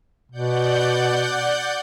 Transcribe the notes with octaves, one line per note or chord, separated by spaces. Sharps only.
B2 D5 F#5 G6